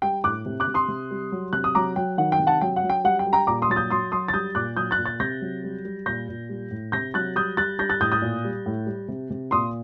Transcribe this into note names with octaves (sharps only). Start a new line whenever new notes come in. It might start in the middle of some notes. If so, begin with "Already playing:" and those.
G3 G5
A2 D6 F#6
C3
D6 F#6
C3
C6 D#6
C3
G3
F#3
C3 F#6
D#6
F#3 A#5 D6
F#3 G5
D#3 F#5
G5
C3
F#5 A5
F#3 G5
F#5
F#3
G5
G3 F#5
G5
G3
G5 A#5
A#2 A#5 D6
C6 D#6
F#3 A6
D#6 G6
F#3 C6 D#6
F#3 C6 D#6
A6
G3 D#6 G6
A#2 D6 F#6
F#3 D#6 G6
F#6 A6
A#2
F#6 A6
C3 G6 A#6
F#3
G3
G3
A#2 G6 A#6
A#2
G3
A2
C3 G6 A#6
F#3 F#6 A6
G3 D#6 G6
G3 F#6 A6
G3 G6 A#6
F#6 A6
A2 D#6 G6
D#6 G6
A#2
G3
A2
G3
C3
C3
A#2 C6 D#6